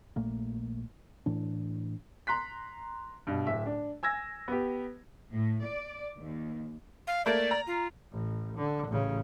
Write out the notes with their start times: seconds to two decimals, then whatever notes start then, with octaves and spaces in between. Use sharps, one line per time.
0.16 A#1 A#2 A3 A#3
1.26 A2 E3 D4
2.27 A#5 C6 F#6 B6
3.27 G2 B2
3.46 D1 E5
3.66 D4
4.03 G#5 E6 G#6 A#6
4.48 B3 G4
5.32 A2
5.64 D5
6.19 D#2
7.07 F5
7.26 A3 A#3 D5
7.51 A#5
7.67 F4
8.11 A1
8.57 D3
8.88 A1 C#3